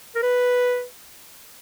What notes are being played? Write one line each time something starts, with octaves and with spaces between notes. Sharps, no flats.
A#4
B4